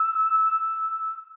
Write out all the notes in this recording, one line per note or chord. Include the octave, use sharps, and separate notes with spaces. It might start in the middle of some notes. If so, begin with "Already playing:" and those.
Already playing: E6